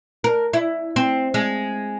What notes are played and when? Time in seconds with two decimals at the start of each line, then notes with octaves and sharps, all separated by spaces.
0.24 A#4
0.53 E4
0.96 C4
1.34 G#3